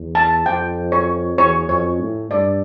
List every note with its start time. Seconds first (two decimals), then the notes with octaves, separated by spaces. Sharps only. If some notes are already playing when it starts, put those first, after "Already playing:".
Already playing: E2
0.15 A5
0.45 F2 G5
0.92 C#5
1.38 E2 C#5
1.69 F2 C#5
2.00 A2
2.31 G2 D5